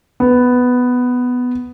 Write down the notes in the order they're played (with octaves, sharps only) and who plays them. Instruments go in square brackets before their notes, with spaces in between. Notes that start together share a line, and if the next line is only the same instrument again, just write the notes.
[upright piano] B3